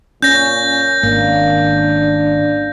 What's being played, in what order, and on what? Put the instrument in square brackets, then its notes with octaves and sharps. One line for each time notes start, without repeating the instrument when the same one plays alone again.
[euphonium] A#2 [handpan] C#4 [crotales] G6 A#6
[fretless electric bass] G#1 [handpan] A#3 [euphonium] D4